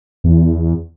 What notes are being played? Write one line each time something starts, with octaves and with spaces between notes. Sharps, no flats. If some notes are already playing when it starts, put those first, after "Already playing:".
E2